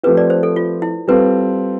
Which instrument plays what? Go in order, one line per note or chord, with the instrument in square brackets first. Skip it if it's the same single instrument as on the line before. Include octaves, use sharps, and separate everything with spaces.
[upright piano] F3 A3 C4 G4 [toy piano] B4
[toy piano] D5
C5
A4
F4
E4
[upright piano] G3 C4 F4 A4 [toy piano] B4